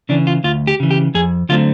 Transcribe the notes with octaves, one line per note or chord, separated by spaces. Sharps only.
C#3 E3 D4
F4
D2 F4
G4
C#3 E3
G4
F2 G#4
D3 F#3 A3 C4 F4